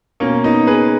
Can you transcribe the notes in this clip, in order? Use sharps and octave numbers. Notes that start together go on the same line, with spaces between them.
B2 A#3 C#4
B3 D#4
G#4 B4